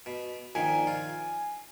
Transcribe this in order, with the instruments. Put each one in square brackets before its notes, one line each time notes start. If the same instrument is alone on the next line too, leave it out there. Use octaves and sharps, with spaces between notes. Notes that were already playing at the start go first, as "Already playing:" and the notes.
[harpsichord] B2
[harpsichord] A#1 A#2 D#3 [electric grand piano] G#5
[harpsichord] F4